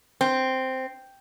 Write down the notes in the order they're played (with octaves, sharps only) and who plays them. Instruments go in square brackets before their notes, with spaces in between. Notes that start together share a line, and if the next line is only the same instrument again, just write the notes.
[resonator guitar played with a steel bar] C4